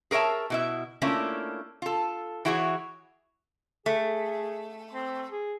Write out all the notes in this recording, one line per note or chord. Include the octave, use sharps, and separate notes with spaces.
G#4 A#4 C#5 E5 A5
B2 E4 E5
A3 A#3 C#4 D4 E4 F4
F4 A4
E3 E4 F#4 G#4 C5 C#5
A3 G#4
C4
G#4